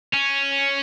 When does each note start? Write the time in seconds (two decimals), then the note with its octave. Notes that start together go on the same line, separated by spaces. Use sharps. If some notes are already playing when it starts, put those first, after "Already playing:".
0.13 C#4